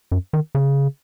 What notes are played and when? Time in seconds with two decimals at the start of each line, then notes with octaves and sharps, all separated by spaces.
0.12 F#2
0.33 D#3
0.55 C#3